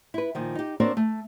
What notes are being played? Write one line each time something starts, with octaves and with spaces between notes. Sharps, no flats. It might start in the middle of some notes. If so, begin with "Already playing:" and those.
E4 B4
A#2 D#3 F3
D#4 G4
A#3 C4 D4 F#4 A#4 C#5
A3